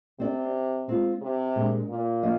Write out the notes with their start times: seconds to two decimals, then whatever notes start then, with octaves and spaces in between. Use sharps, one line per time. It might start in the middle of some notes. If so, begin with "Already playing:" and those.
0.19 C3 C4 G4 D5
0.88 G#3 C4 F4
1.21 C3
1.56 A#2 G#3 D4 G#4
1.89 A#2
2.23 F3 A#3 F4 D#5